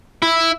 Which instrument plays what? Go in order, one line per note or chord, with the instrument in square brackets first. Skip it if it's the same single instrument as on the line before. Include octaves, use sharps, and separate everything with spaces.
[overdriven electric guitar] E4